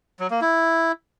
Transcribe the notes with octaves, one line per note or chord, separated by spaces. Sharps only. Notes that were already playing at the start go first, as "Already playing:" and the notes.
F#3
A#3
E4